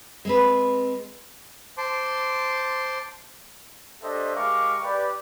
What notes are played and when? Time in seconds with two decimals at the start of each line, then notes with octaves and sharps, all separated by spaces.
0.25 G#3 C4 B4
1.78 C5 A5 C6 D6
4.02 D4 G4 A4 C5 D#5 E5
4.35 G#3 G4 A#4 F5 C#6 D6
4.82 G4 B4 D5